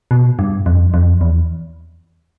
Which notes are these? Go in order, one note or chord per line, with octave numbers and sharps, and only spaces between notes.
B2
G2
F2
F2
E2